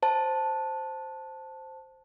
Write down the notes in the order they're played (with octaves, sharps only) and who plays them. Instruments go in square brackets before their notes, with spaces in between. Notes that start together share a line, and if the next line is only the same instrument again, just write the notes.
[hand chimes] C5 A5